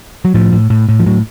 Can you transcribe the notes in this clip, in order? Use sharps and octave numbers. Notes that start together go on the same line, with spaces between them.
F#3
A2 F3
A2
A2
A2
F3
A2 F#3